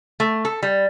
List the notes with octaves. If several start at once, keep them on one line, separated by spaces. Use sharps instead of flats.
A3
A4
G3